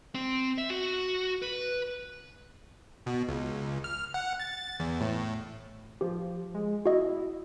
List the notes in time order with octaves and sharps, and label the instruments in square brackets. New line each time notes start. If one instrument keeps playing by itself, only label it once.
[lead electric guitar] C4
E5
F#4
B4
[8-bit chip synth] B2
C#2
F6
F#5
A6
E2
A2
[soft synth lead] F3 [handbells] G4
[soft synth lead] G#3
[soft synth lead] E4 [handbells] F#4 D#5